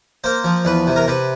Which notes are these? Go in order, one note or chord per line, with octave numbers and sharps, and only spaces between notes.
A#3 C5
F3
E2 B4
C3
A#4
C3 B4